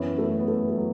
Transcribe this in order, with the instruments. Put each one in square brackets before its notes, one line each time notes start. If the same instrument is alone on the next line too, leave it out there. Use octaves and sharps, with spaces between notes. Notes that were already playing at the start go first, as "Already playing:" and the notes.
Already playing: [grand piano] F#2 E3 C#4 E4 [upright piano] B3
[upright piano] A3
B3
A3
A3
F#3